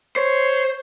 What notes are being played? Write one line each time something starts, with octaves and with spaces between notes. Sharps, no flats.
C5 C#5